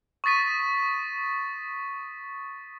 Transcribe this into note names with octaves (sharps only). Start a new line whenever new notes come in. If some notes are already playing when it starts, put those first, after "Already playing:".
C#6 D#6 A6 B6 D#7